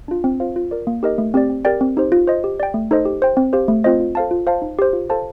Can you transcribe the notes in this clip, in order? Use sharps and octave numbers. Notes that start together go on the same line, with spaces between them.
D4 F4
C4
F4 C5 F5
F4
A#4 D5
A#3
D#4 G4 A#4 D#5
A3
C4 G4 D5
C4
G4 A#4 D5 G5
C4
D#4 G4 C5
F4
C5 D#5
G4
D5 G5
A3
D#4 A4 C5 D#5
G4
C5 G5
C4
G4 C5 F5
A3
C4 F4 C5 D#5
F4
A4 C5 F5 A5
F4
C5 F5 A5
D#4
G4 C5
F4
A4 C5 F5 A5